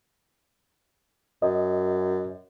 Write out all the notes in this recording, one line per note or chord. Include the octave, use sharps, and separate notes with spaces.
F#2 D#5